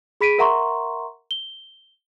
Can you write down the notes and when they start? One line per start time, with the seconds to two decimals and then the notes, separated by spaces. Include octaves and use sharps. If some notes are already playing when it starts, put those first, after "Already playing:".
0.21 G#4 B5 B6 D7 D#7
0.38 A#4 E5 F#5 A#5 C6 C#6
1.31 G7